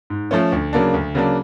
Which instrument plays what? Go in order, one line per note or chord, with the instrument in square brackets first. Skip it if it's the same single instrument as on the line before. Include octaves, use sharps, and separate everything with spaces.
[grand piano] G#2
F3 A3 C#4
D2
C#3 F#3 A#3 D4
D2
C#3 F#3 A#3 D4